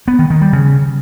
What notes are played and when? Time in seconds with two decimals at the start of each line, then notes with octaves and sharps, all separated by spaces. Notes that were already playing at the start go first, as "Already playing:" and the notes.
0.08 B3
0.19 D#3
0.30 D#3
0.42 G3
0.53 C#3